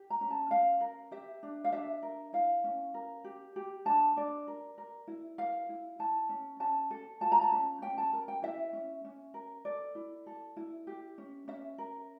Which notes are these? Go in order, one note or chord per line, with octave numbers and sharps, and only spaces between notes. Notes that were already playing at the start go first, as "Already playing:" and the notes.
Already playing: G4
A#5
C#4
A5
C#4 F5
A#4
G4 E5
D4
F5
D4 E5
A#4
E4 F5
C#4
A#4
G4
G4
D4 A5
D4 D5
A#4
A#4
E4
A#4 F5
E4
E4 A5
C#4
C#4 A5
A4
F4 A5
A#5
A5
C#4
C#4 G5
A5
A#4
G5
E4 E5
C#4
C#4
A#4
A4 D5
E4
A4
E4
G4
C#4
C#4 E5
A#4